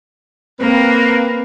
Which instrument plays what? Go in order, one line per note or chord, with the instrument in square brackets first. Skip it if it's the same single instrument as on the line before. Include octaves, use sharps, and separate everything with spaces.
[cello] A#3 [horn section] C4 B4